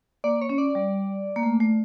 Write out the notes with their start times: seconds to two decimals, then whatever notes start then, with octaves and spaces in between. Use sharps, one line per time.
0.24 A#3 D5
0.41 C#5
0.49 C#4
0.58 D5
0.75 G3
1.36 A#3
1.43 A3
1.60 A3